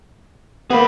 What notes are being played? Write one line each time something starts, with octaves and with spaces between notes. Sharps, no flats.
A#3 B3 G#4 B5